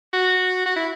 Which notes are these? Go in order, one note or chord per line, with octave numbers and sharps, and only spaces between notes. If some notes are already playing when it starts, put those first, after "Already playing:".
F#4
F#4
E4